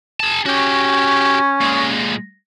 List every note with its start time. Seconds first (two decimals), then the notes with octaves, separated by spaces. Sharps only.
0.20 G#4 A5
0.46 C#4 F#4 G4
1.61 A#2 G#3